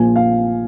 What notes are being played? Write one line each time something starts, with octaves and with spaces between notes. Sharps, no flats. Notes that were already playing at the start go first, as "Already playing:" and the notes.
Already playing: A#1 A#2 F3 G#5
F5